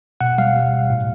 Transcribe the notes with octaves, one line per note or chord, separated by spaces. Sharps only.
B2 F#5
G3 F5
G3
G3
A2